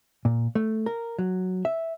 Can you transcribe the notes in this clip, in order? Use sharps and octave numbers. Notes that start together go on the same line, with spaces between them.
A#2
A3
A#4
F#3
E5